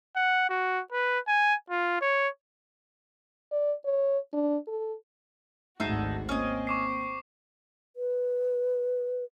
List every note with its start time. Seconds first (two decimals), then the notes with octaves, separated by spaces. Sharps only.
0.16 F#5
0.49 F#4
0.92 B4
1.27 G#5
1.70 F4
2.01 C#5
3.51 D5
3.85 C#5
4.33 D4
4.68 A4
5.80 G#1 D2 G#2 D#4 F#4 E5 A5 C7
6.29 A#3 C4 C#4 D#5
6.67 C#6 D6 C7
7.96 B4